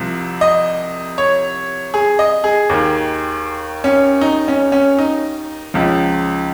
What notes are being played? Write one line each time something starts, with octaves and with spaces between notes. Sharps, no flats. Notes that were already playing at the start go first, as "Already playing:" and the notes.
Already playing: C2 C3 F3
D#5
C#5
G#4
D#5
G#4
D#2 D#3
C#4
D#4
C#4
C#4
D#4
C#2 C#3 F3